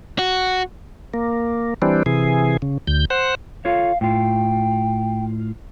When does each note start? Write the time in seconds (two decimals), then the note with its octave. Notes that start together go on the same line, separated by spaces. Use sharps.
0.19 F#4
1.14 A#3
1.82 E3 G3 C4 D4
2.06 C3 E3 G#4
2.62 C#3
2.87 D2 G6
3.10 C5 F#5
3.65 F4 A4 C#5 F5
4.01 A2 F4 G5